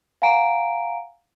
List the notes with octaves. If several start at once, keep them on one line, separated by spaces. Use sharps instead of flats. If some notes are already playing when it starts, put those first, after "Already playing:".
F5 F#5 G#5 A#5 D7